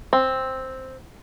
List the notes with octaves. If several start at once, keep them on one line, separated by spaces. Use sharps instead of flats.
C4